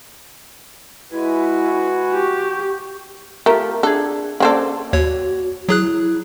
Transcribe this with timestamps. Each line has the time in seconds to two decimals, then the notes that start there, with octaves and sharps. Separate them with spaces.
1.12 G#3 E4 F#4 B4 G#5
2.12 G4 C#6
3.46 A3 F4 G4 A#4
3.83 D4 G#4 A4
4.40 A#3 C4 C#4 G#4 A4 D5
4.93 D#2 F#4 C#5
5.69 F#3 E4 G#4 F#6